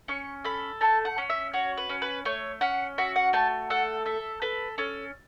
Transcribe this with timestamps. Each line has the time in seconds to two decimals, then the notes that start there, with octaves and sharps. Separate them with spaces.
0.08 C#4 C#6
0.44 A4 B5
0.81 A3 A5
1.05 F#5
1.18 C#4
1.30 E5
1.53 F#4 C#5
1.77 B4
1.89 C#4
2.02 B4
2.25 A3 C#5
2.61 C#4 F#5
2.98 F#4 E5
3.16 F#5
3.33 A3 A5
3.70 A4 F#5
4.05 A4 E5
4.42 A4 B4
4.78 C#4 A4